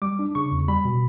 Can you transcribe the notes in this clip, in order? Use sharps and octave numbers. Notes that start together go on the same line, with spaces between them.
G3 D6
D4
C#3 C#6
E2
G3 B5
B2